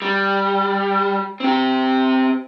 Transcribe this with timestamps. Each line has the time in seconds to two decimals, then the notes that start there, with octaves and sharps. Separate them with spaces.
0.02 G3
1.40 C4 G4